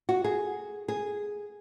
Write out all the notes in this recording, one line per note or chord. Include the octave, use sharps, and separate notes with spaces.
F#4
G#4
G#4